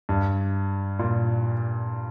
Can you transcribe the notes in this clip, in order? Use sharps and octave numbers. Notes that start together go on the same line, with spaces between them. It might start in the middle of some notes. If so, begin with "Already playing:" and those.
G2
A#2